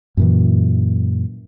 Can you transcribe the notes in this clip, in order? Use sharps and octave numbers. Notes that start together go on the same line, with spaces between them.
F#2 A#2 E3